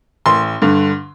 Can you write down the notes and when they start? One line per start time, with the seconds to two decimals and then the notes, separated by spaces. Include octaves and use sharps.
0.26 A1 C6
0.62 G2 D3